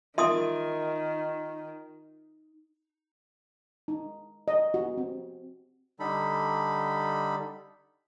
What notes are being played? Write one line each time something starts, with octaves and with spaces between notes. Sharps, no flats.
D#3 F4 A#4 E5 C6 D#6
D#4
D#5
F#4
C4
D3 G3 D#4 A4 B5